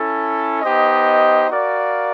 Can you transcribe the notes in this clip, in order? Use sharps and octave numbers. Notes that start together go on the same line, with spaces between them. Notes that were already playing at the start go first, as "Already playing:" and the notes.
Already playing: C#4 E4 A4
B3 D#4 G4 C5 D#5
F#4 A#4 D5 F5